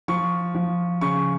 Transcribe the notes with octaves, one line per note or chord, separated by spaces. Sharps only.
F3 C#6
F3
C#3 C#6